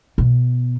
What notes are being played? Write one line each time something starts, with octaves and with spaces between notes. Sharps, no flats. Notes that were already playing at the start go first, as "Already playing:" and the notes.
B2